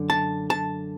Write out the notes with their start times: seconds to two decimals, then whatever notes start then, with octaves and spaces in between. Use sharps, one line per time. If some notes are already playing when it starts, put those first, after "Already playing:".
Already playing: F#2 D3
0.10 A5
0.50 A5